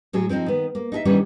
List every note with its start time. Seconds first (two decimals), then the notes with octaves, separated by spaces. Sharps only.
0.13 A2 F#3 G#4
0.29 F3 C4 C#4 D#4
0.46 D#3 B3
0.75 A#3
0.92 D#4 G#4 E5
1.05 D#3 E3 G3 B3 C#4 D4